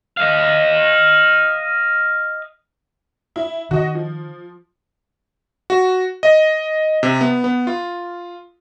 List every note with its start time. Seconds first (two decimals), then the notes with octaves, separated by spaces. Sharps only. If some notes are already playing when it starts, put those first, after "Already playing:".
0.17 D#5 F5
3.36 E4
3.71 D#3 F#4 D#5
3.95 F3
5.70 F#4
6.23 D#5
7.03 C3
7.21 B3
7.44 B3
7.67 F4